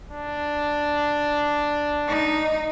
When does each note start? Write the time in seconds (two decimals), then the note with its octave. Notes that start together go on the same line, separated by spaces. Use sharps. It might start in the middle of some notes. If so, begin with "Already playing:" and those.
0.10 D4
2.08 D#4